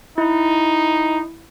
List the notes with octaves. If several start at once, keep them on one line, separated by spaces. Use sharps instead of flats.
D#4 E4